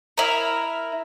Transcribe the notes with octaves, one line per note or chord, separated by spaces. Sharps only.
E4 A#4